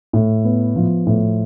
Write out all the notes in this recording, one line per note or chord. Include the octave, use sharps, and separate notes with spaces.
A2
B3
F3
A2